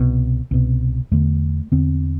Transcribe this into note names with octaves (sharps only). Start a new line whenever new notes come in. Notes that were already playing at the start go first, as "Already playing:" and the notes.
Already playing: C2 B2
C2 B2
E2 D3 A3
E2 D3 C4